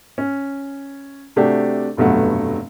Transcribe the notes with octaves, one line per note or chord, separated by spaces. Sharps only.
C#4
C3 A3 D4 F#4 G4
F1 G2 B2 F#3 A3 F#5